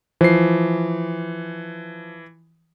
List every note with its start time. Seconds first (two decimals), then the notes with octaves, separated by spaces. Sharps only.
0.21 E3 F3 C7